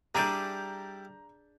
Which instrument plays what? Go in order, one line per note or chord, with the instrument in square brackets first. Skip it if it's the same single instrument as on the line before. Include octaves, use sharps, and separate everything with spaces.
[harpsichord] G3 E4 D5 [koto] D4 G#4 B4 [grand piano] A#5 G6